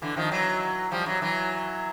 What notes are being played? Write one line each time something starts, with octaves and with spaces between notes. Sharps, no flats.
D3 E3
D#3 F3
E3 F#3
F3 G3
E3 F#3
E3 F#3